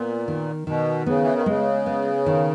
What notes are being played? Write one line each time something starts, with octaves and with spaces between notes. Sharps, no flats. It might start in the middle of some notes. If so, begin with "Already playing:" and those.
Already playing: A#2 B3
D#3
B2 D#3
C#3 B3
E3
D#3
C#3 G#3
B3
D#3